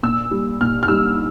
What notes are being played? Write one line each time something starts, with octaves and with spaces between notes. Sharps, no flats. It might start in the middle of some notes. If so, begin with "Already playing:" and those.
A#2 E6
G3
A#2 F6
F6
G3 E6